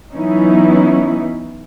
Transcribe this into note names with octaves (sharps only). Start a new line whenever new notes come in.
E3 F#3 B3 C#4 D#4 E4